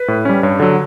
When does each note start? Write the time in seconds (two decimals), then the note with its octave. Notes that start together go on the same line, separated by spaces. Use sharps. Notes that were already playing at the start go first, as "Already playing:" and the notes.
Already playing: B4
0.08 A2
0.25 G3 C#4
0.43 G2 C#5
0.60 D3 F#3